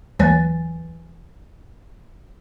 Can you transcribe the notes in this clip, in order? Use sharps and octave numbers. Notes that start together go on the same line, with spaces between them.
D#2 E3 F#3 B4 G#5 A6